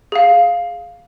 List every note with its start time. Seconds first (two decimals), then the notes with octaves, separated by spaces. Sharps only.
0.12 G#4 F5